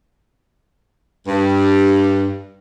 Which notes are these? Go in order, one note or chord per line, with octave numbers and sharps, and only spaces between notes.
G2